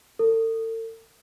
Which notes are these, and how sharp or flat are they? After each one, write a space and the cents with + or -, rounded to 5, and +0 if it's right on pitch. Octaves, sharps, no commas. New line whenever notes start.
A4 +40